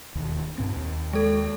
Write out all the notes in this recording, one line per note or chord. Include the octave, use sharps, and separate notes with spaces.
E1 D#2
G2 A#2 C4
D#2
G#3 A4